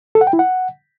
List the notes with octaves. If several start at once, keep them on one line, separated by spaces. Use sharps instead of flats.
A4
F#5
G5
E4
F#5